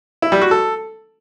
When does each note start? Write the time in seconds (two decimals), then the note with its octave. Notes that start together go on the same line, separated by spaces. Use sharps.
0.22 E4
0.32 G3
0.42 F#4
0.51 A4